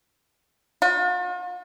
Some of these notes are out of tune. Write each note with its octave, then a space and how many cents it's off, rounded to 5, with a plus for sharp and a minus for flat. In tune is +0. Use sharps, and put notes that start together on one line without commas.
F4 +45